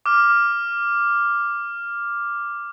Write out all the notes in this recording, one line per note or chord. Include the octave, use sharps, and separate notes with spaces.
D6 F6